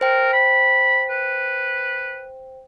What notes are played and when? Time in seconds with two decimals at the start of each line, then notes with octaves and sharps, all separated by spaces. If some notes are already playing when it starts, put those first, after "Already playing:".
0.01 A#4 C5 G5
0.33 B5
1.10 B4